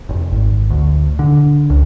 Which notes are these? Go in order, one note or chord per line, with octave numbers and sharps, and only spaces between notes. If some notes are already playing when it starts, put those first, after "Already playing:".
F1
G#1
D2
D3
C#2